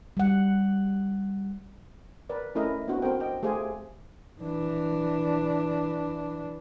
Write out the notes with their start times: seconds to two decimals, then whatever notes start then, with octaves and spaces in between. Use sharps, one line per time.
0.17 G3 F#5
2.30 A#4 B4 D5
2.55 A3 C#4 E4 A4 A#4 D#5
2.88 B3 C4 D4 E4 F#4
3.02 C4 A4 A#4 C5 G5
3.20 D#5 G5
3.43 A3 G4 G#4 C5 F5 G#5
4.42 E3 D4